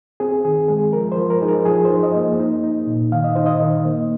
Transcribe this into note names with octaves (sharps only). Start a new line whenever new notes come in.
C4 G#4
D#3 G#4
G#3 G#4
F3 A#4
C5
F3
A#4
D#4 G#4
A#4
F3 G#4
D#4 C5
D#5
A#3
D#4
D#4
A#2
D#3 F5
D#5
D#4 C5
D#5
D#3
A#3